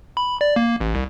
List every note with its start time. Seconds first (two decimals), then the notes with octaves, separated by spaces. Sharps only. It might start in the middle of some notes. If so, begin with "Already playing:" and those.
0.17 B5
0.41 D5
0.56 A#3
0.81 A1
0.95 C2